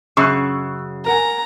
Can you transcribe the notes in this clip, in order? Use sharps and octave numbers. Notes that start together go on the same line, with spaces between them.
F#2 C#3 C#6 E6 F#6
A#4 F#5 G#5 A#5